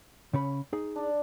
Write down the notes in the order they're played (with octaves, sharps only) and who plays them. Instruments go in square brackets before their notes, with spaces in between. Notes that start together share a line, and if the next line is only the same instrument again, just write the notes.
[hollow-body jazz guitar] C#3 C#4 B5
D#4 G#4
[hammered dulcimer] D4 D5